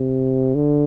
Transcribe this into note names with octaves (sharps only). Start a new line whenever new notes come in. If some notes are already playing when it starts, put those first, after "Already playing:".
Already playing: C3
D3